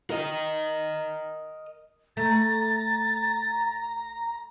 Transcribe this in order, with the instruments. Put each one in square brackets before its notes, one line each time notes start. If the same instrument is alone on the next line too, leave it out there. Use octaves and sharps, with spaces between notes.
[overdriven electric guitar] A#4 D#5
[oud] A3 [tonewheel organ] A#5 [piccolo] A6